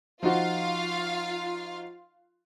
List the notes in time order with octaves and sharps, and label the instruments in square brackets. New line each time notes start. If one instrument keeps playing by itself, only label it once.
[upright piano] F3 D#4 F#4 [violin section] F4 F5